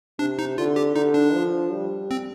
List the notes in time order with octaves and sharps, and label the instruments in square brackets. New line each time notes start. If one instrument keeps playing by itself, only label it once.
[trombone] C3 [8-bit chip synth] D4
[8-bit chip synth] D#4
[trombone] D3 [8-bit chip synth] F4
[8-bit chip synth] G4
[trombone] D3 [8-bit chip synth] D#4
[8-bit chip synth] D4
[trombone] F3
G3
[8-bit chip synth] C4